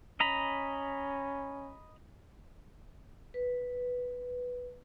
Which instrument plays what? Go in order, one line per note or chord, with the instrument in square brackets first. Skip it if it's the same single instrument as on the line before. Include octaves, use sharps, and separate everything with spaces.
[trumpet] C#4 [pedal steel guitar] D#5 A#5 B5
[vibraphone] B4